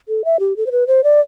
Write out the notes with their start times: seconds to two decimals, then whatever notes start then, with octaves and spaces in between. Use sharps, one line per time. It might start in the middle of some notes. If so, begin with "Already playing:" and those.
0.08 A4
0.25 E5
0.40 G4
0.57 A4
0.66 C5
0.72 B4
0.87 C5
1.04 D5